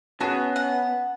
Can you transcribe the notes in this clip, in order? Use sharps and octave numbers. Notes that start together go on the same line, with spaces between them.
B3 C#4 F#4 G#4 A5
F#5